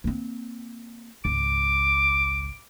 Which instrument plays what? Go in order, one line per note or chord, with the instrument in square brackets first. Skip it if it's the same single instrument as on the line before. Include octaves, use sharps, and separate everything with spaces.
[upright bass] A#3 C4
[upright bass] G#1 C#2 [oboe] D6